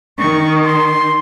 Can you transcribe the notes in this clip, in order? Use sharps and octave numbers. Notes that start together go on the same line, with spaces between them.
D#3 C#6
C6